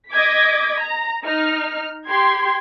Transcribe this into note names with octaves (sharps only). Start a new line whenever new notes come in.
D#5 D6 G#6 B6
A#5
D#4 F6
G4 C6 G#6